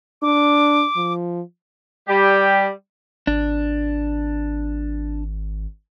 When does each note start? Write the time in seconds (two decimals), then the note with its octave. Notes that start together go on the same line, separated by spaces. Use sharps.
0.22 D4 D6
0.97 F3
2.08 G3 G4
3.27 G#1 D4